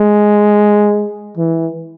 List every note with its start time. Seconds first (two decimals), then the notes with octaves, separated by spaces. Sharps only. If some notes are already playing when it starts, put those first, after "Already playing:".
Already playing: G#3
1.37 E3